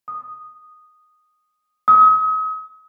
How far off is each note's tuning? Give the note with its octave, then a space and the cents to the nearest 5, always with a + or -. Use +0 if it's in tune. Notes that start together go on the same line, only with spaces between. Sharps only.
D#6 -5
D#6 +40